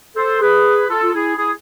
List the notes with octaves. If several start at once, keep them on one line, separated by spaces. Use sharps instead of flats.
A4 C5
G#4 B4
F4 A4
F4
E4 G#4
E4 G#4